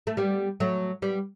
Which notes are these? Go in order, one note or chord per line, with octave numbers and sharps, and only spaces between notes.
A3
G3 B3
F#3 A3
G3 B3